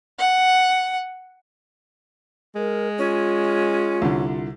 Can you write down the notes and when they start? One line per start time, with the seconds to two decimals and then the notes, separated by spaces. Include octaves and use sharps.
0.19 F#5
2.55 G#3 A#4
2.98 C#4 F4
4.02 C2 D3